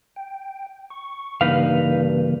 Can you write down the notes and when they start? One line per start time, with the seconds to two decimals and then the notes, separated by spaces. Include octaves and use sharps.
0.16 G5
0.90 C#6
1.41 G2 C#3 E3 A#3 D#4 B4 F5